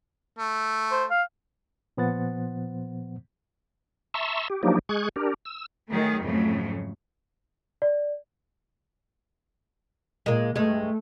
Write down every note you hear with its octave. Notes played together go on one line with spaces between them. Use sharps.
A3
C5
F5
A#2 F3 B3 C5 F#5 A6
E5 A5 A#5 C6 C#6 E6
G4
F3 F#3 A#3 D4 D#4 G4
G#3 G#4 C#6 F#6 G#6
D4 G4 A#4
E6
D#3 F#3 A3 G#4
F2 G#2 C#3 F#3 A3
D5
A#2 G#3 A#3
G2 G#3 A3